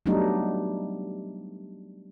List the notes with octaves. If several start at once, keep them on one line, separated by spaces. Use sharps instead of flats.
F#3 G3 A3 B3 D4 D#4